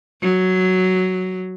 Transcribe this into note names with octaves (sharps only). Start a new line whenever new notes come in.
F#3